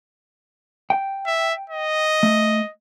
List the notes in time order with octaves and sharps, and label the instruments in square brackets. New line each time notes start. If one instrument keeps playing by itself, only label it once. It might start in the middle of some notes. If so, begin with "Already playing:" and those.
[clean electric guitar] G5
[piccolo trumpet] E5
D#5
[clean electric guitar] A3